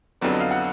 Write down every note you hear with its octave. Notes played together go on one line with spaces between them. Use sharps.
F2 D3 F#3 B3 D5
D#5
F5
F#5